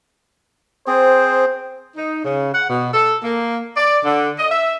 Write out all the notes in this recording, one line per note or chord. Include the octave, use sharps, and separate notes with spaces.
C4 G#4 C5
D#4
C#3
F#5
B2
A4
A#3
D5
D3
D#5
E5